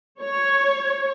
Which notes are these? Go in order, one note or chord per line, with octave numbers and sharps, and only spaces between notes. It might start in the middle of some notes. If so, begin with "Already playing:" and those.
C#5